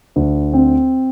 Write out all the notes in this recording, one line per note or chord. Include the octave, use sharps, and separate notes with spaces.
D2
C4